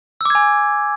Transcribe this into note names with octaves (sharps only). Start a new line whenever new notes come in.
G#5 D6 E6 G#6